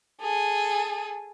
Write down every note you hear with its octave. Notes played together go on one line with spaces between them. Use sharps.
G#4 A4